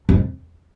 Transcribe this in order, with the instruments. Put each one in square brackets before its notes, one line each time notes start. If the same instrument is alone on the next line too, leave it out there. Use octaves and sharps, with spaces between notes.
[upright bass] F2